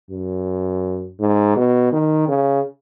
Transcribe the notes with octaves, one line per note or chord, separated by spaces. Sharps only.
F#2
G#2
B2
D#3
C#3